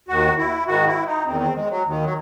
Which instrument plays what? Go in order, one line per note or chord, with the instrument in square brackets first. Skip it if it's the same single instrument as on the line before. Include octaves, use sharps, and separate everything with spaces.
[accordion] D#2 D#3 F#4
E4
G#2 D#3 F#4
E4
D#4
E2 D#3 C4
C4
G#3
F#3
D#2 D#3
F#3